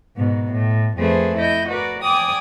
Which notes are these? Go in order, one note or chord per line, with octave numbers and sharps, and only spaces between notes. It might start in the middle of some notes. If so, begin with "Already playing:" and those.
G#2 B2
A2
F2 A3 G#4 B4 C5
E4 D#5 G6
F#4 A#4 B4 D5
D5 G5 G#5 D6 D#6